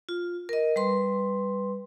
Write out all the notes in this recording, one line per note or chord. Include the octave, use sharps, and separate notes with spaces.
F4
A#4 D#5
G3 B4 C6